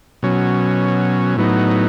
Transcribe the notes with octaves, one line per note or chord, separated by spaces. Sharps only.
B2 F#3 C#4
A2 F#3 B3 D#4